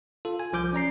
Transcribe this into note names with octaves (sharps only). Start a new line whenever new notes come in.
F4 A4
G#5
C2 F3 D6 G6
C#4 D5 A#5 C7